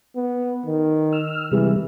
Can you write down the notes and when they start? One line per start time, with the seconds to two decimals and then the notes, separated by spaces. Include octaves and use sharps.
0.16 B3
0.66 D#3
1.12 E6 F6
1.51 C3 E3 G3 G#3